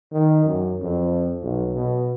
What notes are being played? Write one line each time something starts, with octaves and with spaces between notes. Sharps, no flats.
D#3
F#2
F2
B1
B2